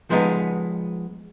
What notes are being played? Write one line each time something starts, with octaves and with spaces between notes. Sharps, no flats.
F3 G#3 B3 D#4